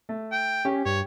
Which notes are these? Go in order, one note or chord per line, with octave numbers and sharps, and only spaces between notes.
A3
G5
C#4 G4
G2 C#5